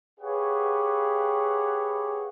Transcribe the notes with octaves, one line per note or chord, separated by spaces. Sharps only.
G4 G#4 B4 C#5 F5 F#5